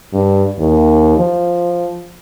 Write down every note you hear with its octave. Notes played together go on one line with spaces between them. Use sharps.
G2
D#2
F3